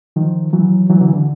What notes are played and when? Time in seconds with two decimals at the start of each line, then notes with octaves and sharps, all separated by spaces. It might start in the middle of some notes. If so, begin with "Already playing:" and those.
0.16 D#3 F3
0.53 E3 F#3
0.90 E3 F#3
1.01 D3 E3
1.14 D3